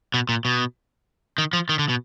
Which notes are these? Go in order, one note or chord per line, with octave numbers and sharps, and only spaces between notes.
B2
A#2
B2
D#3
F3
D#3
D3
B2